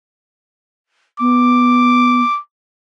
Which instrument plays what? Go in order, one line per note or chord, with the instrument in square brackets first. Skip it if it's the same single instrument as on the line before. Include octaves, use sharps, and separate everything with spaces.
[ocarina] B3 [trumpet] D6